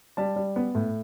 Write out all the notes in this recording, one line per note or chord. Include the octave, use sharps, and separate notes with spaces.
G3 A5
G3
B3
A2